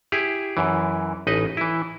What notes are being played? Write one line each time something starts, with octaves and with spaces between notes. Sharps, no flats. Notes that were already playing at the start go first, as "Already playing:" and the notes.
E4 G4 G#4
F#2 E3
A1 D#4 B4 D#5
E3 E4